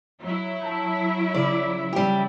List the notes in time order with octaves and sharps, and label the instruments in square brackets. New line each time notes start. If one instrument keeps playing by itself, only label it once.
[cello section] F#3 E4
[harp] A5 A#5 G6
[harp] C#3 B5 [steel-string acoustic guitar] D5
[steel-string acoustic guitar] G3 G4